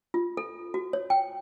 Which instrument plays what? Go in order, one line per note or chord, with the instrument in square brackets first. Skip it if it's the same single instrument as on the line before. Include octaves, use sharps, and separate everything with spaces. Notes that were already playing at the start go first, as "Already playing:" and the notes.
[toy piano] F4
A4
F#4
C#5
G5